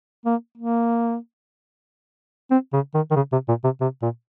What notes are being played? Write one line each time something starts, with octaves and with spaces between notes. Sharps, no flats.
A#3
A#3
C4
C#3
D#3
D#3
C#3
C3
A#2
C3
C3
A#2